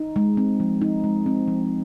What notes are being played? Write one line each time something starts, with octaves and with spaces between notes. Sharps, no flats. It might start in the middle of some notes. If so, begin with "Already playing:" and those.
Already playing: D#4
G#3
C4
F3
D#4
G#3
C4
F3